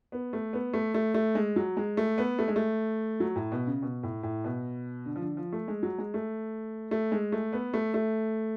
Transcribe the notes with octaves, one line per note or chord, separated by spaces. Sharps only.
B3
A3
B3
A3
A3
A3
G#3
F#3
G#3
A3
B3
A3
G#3
A3
F#3
A2
B2
C#3
B2
A2
A2
B2
D3
F3
D3
F3
A3
G#3
F#3
G#3
A3
A3
G#3
A3
B3
A3
A3